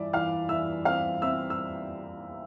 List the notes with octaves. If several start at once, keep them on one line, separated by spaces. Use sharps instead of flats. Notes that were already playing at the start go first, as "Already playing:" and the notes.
Already playing: G2 E3 D5 E5 D6
E3 F5 F6
E3 E5 E6
C4 F5 F6
C4 E5 E6
E6